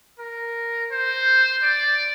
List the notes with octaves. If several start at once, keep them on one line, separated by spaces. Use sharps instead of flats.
A#4
C5
D5